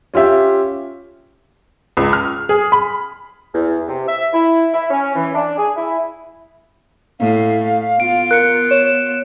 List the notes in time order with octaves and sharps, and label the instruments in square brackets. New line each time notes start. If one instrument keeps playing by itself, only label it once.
[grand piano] C#4 F4 G4 E5
[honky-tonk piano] C#2
F6
G#4
B5
[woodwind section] E2
C3
E5
E4
E4
C#4
E3
D4
G#4
E4
[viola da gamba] A2 [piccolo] F5
[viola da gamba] B3 F4 [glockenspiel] D7
[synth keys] A#4 [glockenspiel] F#6 C#7
[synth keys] C#5 [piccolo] E7